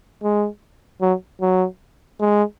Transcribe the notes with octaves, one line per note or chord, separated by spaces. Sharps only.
G#3
F#3
F#3
G#3